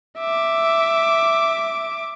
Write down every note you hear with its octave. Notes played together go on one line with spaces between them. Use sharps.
E5 D6